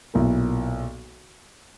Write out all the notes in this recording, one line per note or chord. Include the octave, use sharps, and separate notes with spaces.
B1 A#2 A#3 E4 A#4